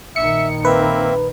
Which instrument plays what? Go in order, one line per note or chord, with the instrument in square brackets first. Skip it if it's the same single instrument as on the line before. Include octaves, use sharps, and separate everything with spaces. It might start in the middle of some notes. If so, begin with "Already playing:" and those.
[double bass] A#1 D#3 [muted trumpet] E5 [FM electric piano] C#7
[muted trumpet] A#3 [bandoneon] C4 E5 [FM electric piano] B4